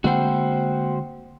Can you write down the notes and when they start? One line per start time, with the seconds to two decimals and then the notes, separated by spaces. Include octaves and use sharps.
0.04 D3 G#3 A#3 C4 F#4 C5 F#5 G5